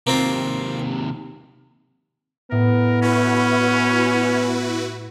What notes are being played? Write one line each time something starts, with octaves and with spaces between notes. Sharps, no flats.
D#2 C3 A#3 C4 F4
A2 B3 A#4
C#4 E4 F#4 B4